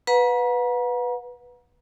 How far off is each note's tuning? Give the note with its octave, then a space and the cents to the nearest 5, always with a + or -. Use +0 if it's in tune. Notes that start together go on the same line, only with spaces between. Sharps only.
B4 +0 F#5 -40 A#5 +40